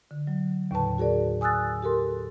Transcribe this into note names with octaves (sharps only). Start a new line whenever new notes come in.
D3
F#3
D#2 A2 C#3 B4 A5
F#4 G#4 A#4 D5
G#5 D#6 E6 F#6 A6
G4 A4 A#4 C6